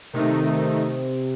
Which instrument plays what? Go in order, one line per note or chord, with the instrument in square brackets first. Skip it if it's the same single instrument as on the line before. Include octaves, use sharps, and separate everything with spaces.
[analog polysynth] C3 [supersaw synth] D#3 A3 D#4